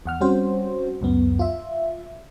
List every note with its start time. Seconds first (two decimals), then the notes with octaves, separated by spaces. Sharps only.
0.06 E2 F#5 F6
0.21 G3 C4 C#4 F#4 C5
1.01 C#2 F#2 B3
1.39 F4 E5